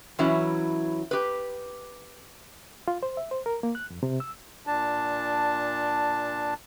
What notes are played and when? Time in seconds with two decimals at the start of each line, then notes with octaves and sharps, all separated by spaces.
0.19 E3 F#3 C#4 E4
1.11 G4 B4
2.88 F4
3.03 C5
3.17 E5
3.31 C5
3.46 A#4
3.63 A#3
3.75 F#6
3.90 F2
4.03 C3
4.20 E6
4.67 A#2 D4 A5